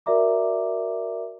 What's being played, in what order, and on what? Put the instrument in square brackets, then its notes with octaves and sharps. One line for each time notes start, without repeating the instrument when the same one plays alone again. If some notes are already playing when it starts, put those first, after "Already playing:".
[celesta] F#4 A#4 D5 E5 A#5 D6